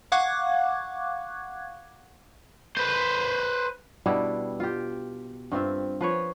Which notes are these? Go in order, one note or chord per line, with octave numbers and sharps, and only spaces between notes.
F5 F#5 C#6 D6 F#6 G#6
B4 C5
B2 G3 D4 E4
F4 G4
G2 C4 F4 E5
F3 B4 C#5